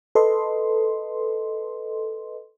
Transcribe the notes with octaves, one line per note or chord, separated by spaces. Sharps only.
A4 B4 D#5 C6